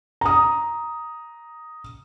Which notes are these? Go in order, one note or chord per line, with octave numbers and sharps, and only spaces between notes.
A#5 D#6